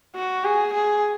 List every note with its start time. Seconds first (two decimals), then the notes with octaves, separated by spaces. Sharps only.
0.15 F#4
0.45 G#4
0.74 G#4